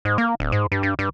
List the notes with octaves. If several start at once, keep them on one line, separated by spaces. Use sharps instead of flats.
G#2
A#3
D1
G#2
G2
G2
G2